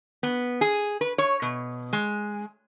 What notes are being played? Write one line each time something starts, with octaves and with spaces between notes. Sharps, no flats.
B3
G#4
B4
C#5
B2
G#3